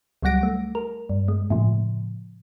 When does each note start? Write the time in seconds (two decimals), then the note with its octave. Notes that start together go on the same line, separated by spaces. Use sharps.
0.23 C#2 F#3 G3 F#5 A#6 D7
0.43 A3
0.75 A#4
1.10 G2
1.28 G#3
1.50 A2 C#3 F3